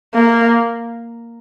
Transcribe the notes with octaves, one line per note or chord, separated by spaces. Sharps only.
A#3